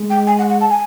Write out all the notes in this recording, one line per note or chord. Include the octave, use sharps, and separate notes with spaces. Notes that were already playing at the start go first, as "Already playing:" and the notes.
Already playing: G#3
G5
G#5
F#5
F#5
A5
G#5